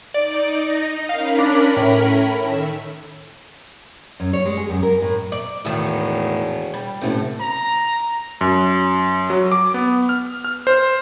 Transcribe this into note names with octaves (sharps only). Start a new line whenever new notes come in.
D#4 D5
A#6
C#4 A#4 F5 B5
D4
A2
D#3 E5
F#2
C#5
G#3
G#4
F#2
A#4
A2
D5
E1 A2 D#3
G3
F#1 A2 C3
A#5
F#2
F#3
D6
B3
F6
F6
C5